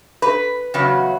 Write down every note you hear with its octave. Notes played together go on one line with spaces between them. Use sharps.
B4
E2 C#3 F#3